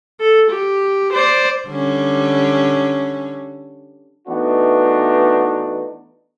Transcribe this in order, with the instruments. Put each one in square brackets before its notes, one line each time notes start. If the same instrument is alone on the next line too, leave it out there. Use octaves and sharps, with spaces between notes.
[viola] A4
G4
C5 D5
[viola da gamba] D3 G3 C#4
[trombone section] E3 A3 B3 D4 D#4 F#4